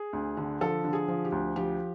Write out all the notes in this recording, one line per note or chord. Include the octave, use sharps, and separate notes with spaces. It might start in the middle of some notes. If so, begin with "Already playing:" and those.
Already playing: G#4
D2
D3
F3 A4
D3
G#4
F3
G4
D2
F3 G4